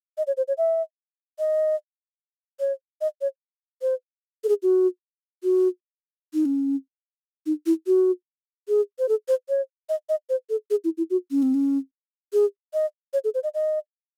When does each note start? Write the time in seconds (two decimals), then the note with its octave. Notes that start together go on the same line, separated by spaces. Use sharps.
0.18 D#5
0.27 C#5
0.37 C5
0.48 C#5
0.58 E5
1.39 D#5
2.60 C#5
3.01 D#5
3.21 C#5
3.82 C5
4.44 A4
4.49 G#4
4.63 F#4
5.43 F#4
6.34 D#4
6.45 C#4
7.46 D#4
7.66 E4
7.87 F#4
8.69 G#4
8.99 C5
9.09 A4
9.28 C5
9.49 C#5
9.89 D#5
10.09 D#5
10.29 C5
10.50 A4
10.70 G#4
10.84 E4
10.97 E4
11.10 F#4
11.31 C#4
11.42 C4
11.54 C#4
12.33 G#4
12.74 D#5
13.13 C#5
13.24 A4
13.34 C5
13.44 D#5
13.54 D#5